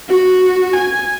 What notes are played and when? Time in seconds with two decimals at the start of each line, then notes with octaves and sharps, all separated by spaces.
0.09 F#4
0.73 G#5